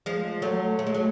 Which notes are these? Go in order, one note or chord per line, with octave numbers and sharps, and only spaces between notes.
F3 G#3
F#3 A3
A3
G#3
F#3